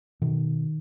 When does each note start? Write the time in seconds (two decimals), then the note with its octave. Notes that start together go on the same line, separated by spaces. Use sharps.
0.22 B2 D#3